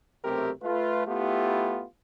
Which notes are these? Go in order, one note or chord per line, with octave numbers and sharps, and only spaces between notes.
B1 C3 A3 C4 G4 A#4
A3 F4 B4
A3 B3 E4 F4 G4